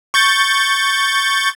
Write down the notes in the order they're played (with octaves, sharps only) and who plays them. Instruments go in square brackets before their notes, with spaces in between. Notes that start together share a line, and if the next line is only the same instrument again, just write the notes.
[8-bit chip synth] C#6 G6 A6